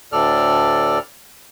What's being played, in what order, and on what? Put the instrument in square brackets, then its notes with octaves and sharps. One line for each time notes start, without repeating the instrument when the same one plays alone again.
[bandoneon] D2 A2 A4 D5 F6